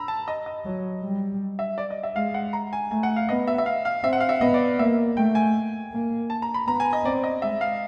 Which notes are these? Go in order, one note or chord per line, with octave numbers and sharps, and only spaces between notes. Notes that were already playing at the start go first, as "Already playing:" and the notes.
Already playing: A#5 B5 E6
A5
D#5
D#5
F#3
G3
E5
D5
D#5
E5
G#3 F5
F#5
A#5
G#5
A3 G#5
F#5
F5
B3 D#5
E5
E5
F5
F5
C4 E5
F#5
F5
E5
B3 D#5
D5
A#3 E5
A3 G5
G#5
A#3
A5
A#5
B5
B3 A#5
G#5
D#5
C4 D5
D#5
G#3 E5
F5